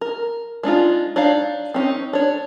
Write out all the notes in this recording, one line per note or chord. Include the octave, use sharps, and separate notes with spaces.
A#4
G#3 D4 D#4 F4
D4 D#4 C#5 F5
C4 C#4 D#4
D4 C#5